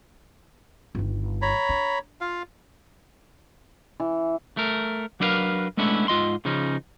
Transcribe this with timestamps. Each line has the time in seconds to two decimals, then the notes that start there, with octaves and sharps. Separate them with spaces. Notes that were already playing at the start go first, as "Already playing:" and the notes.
0.95 G1 D#3
1.42 C#5 A#5 B5
1.69 D4
2.21 F4 F5
4.00 E3
4.57 A3 A#4
5.20 F#3 D4 E4 A#4 B4 F5
5.77 G#3 A3 B3 C#4 D4 E4
6.08 G#2 F4 D#5 C6
6.45 C#3 F3 C#4 D#4